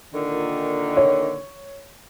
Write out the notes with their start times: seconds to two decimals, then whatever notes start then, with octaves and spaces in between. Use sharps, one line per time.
0.13 A#2 D3 D#3
0.97 C#5